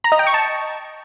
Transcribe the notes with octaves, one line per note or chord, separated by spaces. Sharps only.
A#5
D#5
G5
C#6
A5